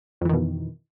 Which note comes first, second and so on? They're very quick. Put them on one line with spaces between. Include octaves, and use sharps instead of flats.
F2 E3 D#3 B2